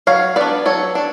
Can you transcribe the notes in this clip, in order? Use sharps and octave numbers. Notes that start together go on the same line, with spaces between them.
F#3 C#5 F5
B3 D4 B4 D5
F#3 A4 C#5
D4